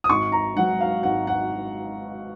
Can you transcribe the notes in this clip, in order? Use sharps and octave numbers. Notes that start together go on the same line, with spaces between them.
D#6
G#1 C#6
A#5
G#2 F#3 F#5
F5
G#1 F#5
F#5